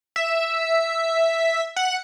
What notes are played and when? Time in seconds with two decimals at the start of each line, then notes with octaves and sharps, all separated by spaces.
0.16 E5
1.76 F#5